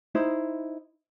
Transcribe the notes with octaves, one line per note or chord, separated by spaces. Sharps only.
D#4 E4 C5